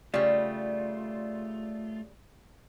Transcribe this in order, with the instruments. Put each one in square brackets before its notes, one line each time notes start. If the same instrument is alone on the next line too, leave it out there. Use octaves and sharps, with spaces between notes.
[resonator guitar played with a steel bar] C#3 G3 [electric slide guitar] A3 F4 [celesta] D5